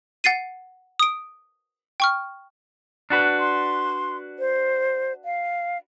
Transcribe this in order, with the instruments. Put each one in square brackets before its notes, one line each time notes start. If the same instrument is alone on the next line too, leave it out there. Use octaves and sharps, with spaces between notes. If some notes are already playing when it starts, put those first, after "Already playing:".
[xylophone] F#5 A6 C7 D#7
D#6 D7
G5 C#6 F6
[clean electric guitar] D4 F#4 B4
[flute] C6
C5
F5